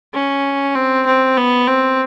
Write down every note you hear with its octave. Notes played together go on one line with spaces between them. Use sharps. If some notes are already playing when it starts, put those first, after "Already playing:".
C#4
C4
C4
B3
C4